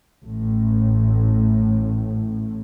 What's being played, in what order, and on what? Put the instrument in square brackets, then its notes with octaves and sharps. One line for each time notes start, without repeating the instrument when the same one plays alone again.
[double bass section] A1 A2